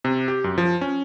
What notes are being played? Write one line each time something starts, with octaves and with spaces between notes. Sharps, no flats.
C3
G4
F#2
F3
C#4